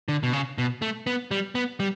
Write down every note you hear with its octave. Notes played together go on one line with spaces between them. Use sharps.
D3
B2
C#3
B2
A3
B3
G3
B3
G3